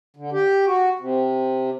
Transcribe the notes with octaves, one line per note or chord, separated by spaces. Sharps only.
D3
G4
F#4
C3